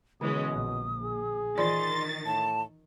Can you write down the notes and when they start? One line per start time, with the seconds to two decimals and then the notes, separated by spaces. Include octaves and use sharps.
0.21 B2 D3 E3 G#3 C#4 D#6
0.52 A#1
1.03 G#4
1.58 D#3 E3 F4 D5 C6 A6
2.26 A2 A5